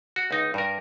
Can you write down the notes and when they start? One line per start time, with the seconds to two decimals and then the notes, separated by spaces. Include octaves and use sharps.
0.16 F#4
0.31 C#2 D#4
0.54 G2 A#4